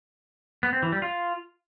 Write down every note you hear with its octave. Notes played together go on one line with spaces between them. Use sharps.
B3
C4
E3
G3
F4